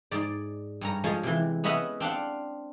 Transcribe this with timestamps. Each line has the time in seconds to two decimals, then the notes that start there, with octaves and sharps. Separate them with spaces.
0.11 G#2 D5
0.81 G2 C#4 A#5
1.04 F3 G#3 C#4
1.23 C3 E3
1.64 B3 C#4 B4 D#5 E5 F#5
2.00 C4 D4 F5 F#5